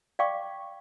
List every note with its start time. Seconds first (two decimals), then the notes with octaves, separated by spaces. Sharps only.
0.19 D5 F5 G5 C#6 D6